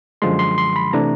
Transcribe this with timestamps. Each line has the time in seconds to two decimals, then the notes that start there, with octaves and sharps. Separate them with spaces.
0.22 F#2 D3 F3 G#3 C6
0.39 C6
0.58 C6
0.76 B5
0.93 C3 E3 A3 D4 A#5